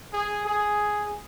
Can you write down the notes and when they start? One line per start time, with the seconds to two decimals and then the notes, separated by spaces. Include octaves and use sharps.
0.13 G#4
0.47 G#4